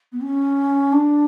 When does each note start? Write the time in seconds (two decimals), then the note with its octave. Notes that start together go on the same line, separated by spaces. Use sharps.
0.12 B3
0.21 C#4
0.93 D4